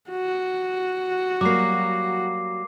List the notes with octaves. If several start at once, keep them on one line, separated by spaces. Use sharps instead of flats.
F#4
F#3 G3 A#3 D6 C7